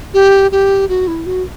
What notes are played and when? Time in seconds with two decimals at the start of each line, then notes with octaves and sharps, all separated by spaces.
0.14 G4
0.52 G4
0.89 F#4
1.08 E4
1.26 F#4